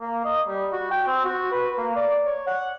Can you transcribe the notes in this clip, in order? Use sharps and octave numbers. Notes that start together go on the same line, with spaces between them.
A#3
D#5
G3
F#4
G5
C4
F#4
B4
A#3
D5
C#5
F#5